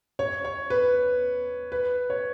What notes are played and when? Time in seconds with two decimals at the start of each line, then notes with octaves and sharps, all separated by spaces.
0.19 C#5
0.44 C#5
0.70 B4
1.72 B4
2.10 C#5